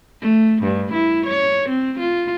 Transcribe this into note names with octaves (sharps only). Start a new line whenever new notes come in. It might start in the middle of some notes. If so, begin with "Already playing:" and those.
A3
G2
E4
C#5
C4
F4